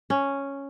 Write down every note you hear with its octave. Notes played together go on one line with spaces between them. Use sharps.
C#4